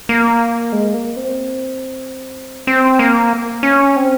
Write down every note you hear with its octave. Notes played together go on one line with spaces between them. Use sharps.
A#3
G#3
A#3
C4
C4
A#3
C#4
C4